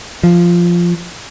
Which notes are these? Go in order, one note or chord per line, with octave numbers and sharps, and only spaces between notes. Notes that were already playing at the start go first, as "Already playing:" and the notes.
F3